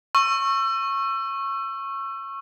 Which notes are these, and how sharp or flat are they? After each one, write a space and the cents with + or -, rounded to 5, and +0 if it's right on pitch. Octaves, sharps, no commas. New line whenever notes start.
C#6 -15 E6 +30